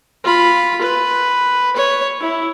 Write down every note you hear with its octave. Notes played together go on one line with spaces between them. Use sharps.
F4 B5
B4
C#5
E4